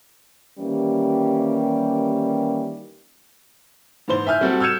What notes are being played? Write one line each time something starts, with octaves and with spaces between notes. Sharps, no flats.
D#3 E3 G3 A#3 C#4 G4
G#2 E3 C5 G7
E5 G#5 F6 G6
G3 C4 F#4 A4
E6 F6 G6 G#6 C#7 E7